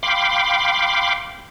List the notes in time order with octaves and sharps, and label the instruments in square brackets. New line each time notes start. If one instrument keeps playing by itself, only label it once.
[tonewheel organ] F5 G5 B5 C6 D6